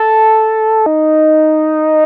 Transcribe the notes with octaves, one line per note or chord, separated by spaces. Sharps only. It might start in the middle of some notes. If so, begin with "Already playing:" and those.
Already playing: A4
D#4